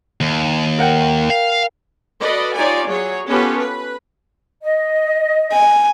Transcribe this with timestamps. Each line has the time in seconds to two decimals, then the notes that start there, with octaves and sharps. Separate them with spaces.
0.21 D#2
0.78 A#4 F#5 G5
1.30 F5
2.21 F#4 A4 B4 D5 D#5
2.56 D#4 F4 G4 C#5 D5 G#5
2.88 F#3 G#4 C#5
3.29 B3 C#4 F4 G4 A4 B4
3.59 B4
4.63 D#5
5.53 G#5